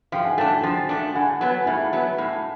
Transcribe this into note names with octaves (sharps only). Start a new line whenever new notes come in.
F3 F5 G5
F#5 G#5
A3 D4 G5 A5
G5 A5
F3
A3 D4
A2 F#5 G#5
F#3 B3
A2 E5 F#5
F#3 B3
A2